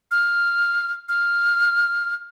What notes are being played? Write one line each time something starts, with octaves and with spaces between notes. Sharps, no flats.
F6
F6